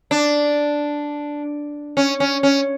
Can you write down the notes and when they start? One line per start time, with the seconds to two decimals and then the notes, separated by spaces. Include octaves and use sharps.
0.11 D4
1.97 C#4
2.20 C#4
2.43 C#4